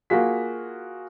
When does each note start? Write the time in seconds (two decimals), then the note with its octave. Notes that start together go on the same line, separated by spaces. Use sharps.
0.10 A#3 F4 F#4 G#4 B6